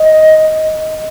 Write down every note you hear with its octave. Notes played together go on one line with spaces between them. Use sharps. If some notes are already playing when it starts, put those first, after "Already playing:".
Already playing: D#5